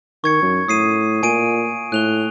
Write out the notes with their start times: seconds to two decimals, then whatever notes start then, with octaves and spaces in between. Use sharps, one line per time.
0.24 D#3 C#6 G#6 C#7
0.42 F#2
0.68 A2 D#6 C7 D#7
1.23 A#2 G#5 D7 D#7
1.92 A2 F#6 F7 G7